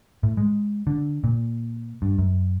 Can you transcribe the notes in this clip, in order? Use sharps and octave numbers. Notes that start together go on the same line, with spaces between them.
A2
G#3
D3
A#2
G2
F#2